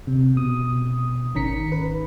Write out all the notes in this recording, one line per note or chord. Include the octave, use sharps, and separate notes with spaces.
C3
B2 D#6
G#1 D#3 C#4 A#5 B6 C#7
B4